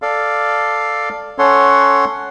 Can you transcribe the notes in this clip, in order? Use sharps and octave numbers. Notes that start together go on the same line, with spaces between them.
A4 D5 F5
C#4 A4 C#5 F#5 C6